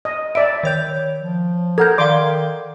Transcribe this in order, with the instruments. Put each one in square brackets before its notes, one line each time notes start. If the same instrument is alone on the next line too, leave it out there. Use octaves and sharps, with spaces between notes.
[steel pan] D#5
[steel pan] D5 E5 [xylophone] D7
[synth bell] D#3 C#5 G6
[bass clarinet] F3
[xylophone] A4 F#5 G6 [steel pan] A#4 [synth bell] G#6
[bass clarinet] D#3 [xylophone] D5 F5 [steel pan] C6 D6